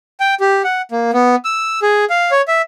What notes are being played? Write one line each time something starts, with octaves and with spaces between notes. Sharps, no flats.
G5
G4
F#5
A#3
B3
E6
G#4
F5
C#5
E5